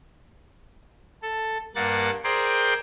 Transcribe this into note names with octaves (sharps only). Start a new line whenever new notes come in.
A4
G2 A#3 F#5 A6
G#4 A#4 C5 D5 G5 C6